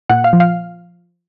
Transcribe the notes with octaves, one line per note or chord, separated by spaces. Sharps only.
A#2 F#5
F5
F3
F5